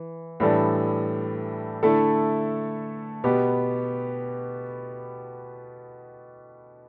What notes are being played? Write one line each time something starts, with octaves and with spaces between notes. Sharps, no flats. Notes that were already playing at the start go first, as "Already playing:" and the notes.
Already playing: E3
A2 E3 G3 D4 A4
D3 A3 E4 A4
B2 B3 G4